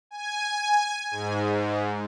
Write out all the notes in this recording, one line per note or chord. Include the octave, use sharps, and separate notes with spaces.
G#5
G#2